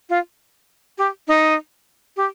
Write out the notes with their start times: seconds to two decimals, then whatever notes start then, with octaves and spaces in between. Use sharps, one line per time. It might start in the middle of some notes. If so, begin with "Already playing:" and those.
0.09 F4
0.98 G4
1.28 D#4
2.17 G4